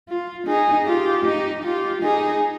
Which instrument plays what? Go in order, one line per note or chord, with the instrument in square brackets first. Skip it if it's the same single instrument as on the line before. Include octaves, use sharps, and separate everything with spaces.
[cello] F4
[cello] D#4 [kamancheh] G#4
[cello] F4 [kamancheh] G4
[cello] D#4
[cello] F4 [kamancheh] G4
[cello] D#4 [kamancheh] G#4